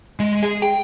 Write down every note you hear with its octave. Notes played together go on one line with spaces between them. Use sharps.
G#3
G#4
G5